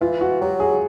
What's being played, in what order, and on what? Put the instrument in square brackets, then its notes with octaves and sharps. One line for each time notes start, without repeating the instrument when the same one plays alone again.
[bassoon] E3 [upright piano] F4
[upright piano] F#4
[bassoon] F#3 [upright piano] G4
[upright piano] G#4